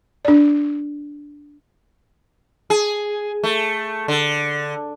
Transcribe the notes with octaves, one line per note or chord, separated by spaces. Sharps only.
D4 D5
G#4
A3
D3